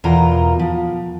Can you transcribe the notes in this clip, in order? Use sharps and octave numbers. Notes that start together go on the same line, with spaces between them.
E2 B2 F4 A#4 A#5
F3